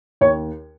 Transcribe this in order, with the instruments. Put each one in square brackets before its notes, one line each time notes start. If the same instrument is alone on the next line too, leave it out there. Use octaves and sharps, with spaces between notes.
[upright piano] D#2 C#5